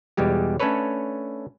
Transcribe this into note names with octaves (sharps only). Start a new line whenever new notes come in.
E2 B2 G3 G#3 G4
A3 C#4 D4 A4 B4 C#5